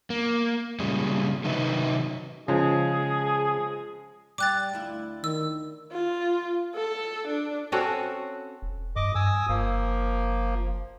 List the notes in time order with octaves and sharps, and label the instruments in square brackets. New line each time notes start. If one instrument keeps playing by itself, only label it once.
[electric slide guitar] A#3
A#2 C#3 G3 G#3
C3 D#3 F#3 D#4 B4 E5
[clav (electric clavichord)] C#3 [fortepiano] F3 G#3 [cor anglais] G#4
[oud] G3 [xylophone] D6 F#6 A6
[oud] D2 E4 F4
[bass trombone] D#3 [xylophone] E6
[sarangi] F4
A4
D4
[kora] C4 C#4 F#4 A4
[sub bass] E1
[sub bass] G2 [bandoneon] D#5 D6
[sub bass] G2 [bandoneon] G#5 D#6 E6
[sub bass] F#1 [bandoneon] F3 A#3